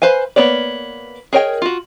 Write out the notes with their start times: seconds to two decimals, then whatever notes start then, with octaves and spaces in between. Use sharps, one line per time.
0.02 B4 C5 F5 G#5
0.36 A#3 B3 C#5 D5
1.33 G#4 A#4 C#5 D#5 G5
1.62 F4 F#4